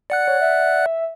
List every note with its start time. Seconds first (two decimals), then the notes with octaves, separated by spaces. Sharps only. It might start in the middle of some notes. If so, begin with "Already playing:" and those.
0.10 D5 F#5 F#6 C#7
0.28 C#5
0.41 E5